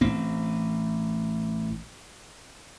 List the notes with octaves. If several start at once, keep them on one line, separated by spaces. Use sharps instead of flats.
A1 C4